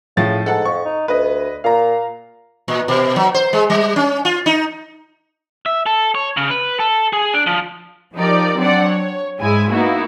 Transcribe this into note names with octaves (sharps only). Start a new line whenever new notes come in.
A2 C#3 F3 A6
G#2 A4 F#5 A5
F2 C#6
D#4
D2 B4 D#5
A#2 F5 A#5
A#2
B2
F#3
C5
G#3
G3
C#4
F4
D#4
E5
A4
C#5
C#3
B4
A4
G#4
D4
F3
F3 D#4 G4 A#4 D5
F#3 C4 D4 D5 F#5
C#5
G#2 G#3 E4 G#5
A#3 B3 D#4 E4 F#4